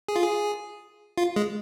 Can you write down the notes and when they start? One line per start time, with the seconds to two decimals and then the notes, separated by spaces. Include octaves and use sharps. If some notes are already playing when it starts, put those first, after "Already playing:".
0.08 G#4
0.16 F4
0.23 G#4
1.18 F4
1.36 G#3